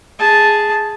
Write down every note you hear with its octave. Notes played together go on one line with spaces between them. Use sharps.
G#4 A5